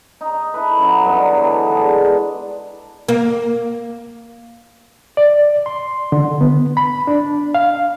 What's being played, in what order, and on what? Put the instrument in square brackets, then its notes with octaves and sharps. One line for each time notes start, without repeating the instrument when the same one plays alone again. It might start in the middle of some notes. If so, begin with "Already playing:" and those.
[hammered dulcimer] D#4
E4 A4 B4
F#2 F#3
G2 B3 D#4 D5
D3 E3 F#3 B3
G#3 D4
[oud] A#3
[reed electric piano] D5
C6
D3
B3
B5
D4
F5